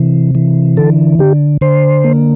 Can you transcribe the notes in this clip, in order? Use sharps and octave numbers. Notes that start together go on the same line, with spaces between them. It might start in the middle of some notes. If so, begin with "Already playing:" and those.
Already playing: C3 E3
E3
D3 A4
D3 G4
D3 C5
A#3